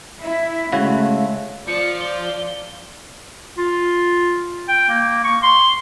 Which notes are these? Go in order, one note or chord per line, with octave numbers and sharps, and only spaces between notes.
E4
C#3 G#3 A3 E4 F#4 F5
F3 F4 D5 C#7
G7
F4
G5
A#3
C#6
C6